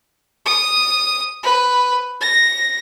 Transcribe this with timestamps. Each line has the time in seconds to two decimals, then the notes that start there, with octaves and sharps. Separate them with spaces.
0.46 D#6
1.43 B4
2.21 A#6